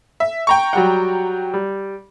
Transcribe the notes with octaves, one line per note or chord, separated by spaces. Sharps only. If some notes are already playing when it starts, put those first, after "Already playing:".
E5
G5 A#5 C#6
F#3 G3 F#5
G3